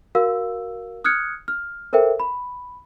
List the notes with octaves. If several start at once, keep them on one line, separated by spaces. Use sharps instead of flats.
F#4 A#4 F5 E6
D#6 F6 F#6 G#6 C#7
F6
A4 A#4 C5 E5 G5
B5